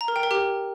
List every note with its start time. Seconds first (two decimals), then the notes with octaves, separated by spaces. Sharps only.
0.01 A#5
0.08 A#4
0.16 G5
0.23 A#4
0.31 G4